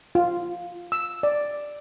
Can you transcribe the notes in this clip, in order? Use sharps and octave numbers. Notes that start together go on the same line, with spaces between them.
F4
E6
D5